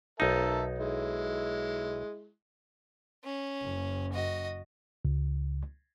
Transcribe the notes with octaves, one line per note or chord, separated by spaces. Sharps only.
B1 D#4 A#4 E5 A5
G#3 E4
C#4
F#1
F#4 D#5
C#2